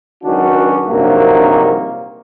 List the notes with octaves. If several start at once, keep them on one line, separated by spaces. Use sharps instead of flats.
C#2 D#3 F#3 C#4 D4 F#4
A#1 G2 C3 D#3 F#3 A#3